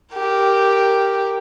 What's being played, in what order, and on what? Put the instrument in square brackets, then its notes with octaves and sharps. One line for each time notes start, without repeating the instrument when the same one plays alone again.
[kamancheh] G4 A#4